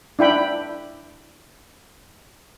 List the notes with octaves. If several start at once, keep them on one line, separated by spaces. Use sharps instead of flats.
D4 E4 G5 B5